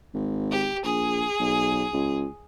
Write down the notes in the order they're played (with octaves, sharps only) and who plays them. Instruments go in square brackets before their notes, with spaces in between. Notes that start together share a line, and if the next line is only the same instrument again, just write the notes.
[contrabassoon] G#1
[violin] G4
[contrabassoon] A#1 [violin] G#4
[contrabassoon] B1
C#2